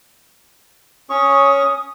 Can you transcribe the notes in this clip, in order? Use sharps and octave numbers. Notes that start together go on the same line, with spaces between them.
C#4 C#5 C#6 D#6